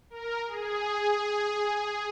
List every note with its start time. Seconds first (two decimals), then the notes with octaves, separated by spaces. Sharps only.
0.10 A#4
0.47 G#4